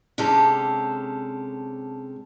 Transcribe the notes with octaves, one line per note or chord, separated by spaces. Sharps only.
C3 G#3 C#4 D4 G4 A4